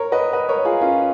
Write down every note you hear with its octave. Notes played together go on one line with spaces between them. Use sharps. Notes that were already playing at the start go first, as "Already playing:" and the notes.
Already playing: A#4 C#5
B4 D#5
B4 D#5
A#4 C#5
F4 G#4
C#4 F4